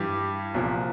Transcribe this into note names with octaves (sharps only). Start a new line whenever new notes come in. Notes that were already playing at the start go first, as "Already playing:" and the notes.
Already playing: G2 E3 G4
C2 A#2 F3